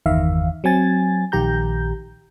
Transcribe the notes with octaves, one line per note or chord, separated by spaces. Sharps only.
G1 E2 D#3 E5 F5
F#3 C4 G#5 A6
A#1 D#3 G4 A#5 G6